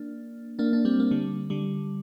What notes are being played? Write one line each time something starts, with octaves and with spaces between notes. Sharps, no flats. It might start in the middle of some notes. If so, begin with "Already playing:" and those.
Already playing: A#3 D4
A#3 D4
D4
G3 C4
A#3
D3 G3
D3 G3